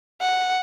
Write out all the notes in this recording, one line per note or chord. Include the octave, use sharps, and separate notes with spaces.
F#5